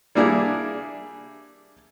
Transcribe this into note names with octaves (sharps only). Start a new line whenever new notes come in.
G3 A#3 D4 E4 G#4